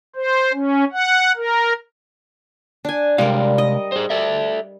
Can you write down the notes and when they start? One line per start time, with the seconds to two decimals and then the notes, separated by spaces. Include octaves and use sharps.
0.15 C5
0.53 C#4
0.92 F#5
1.36 A#4
2.85 D4 G#5
3.18 C3 G3 G#3 A#4 F5
3.58 D#5
3.92 G#4 C5
4.10 A4 D5 E5